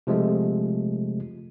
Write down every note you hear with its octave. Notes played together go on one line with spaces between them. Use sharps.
C3 F3 G#3 A3